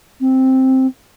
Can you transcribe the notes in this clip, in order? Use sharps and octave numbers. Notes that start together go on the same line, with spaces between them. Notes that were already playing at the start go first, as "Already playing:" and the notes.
C4